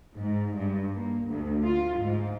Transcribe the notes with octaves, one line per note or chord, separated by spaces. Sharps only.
G#2
G2
A#3
D2
F4
G#2